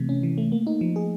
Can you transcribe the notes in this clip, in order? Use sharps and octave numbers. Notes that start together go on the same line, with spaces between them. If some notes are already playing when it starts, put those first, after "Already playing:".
Already playing: C3 E3 A3
C#4
E3
A3
A#3
D#4
F3
G#4